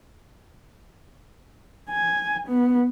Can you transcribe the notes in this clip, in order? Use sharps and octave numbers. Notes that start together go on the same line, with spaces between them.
G#5
B3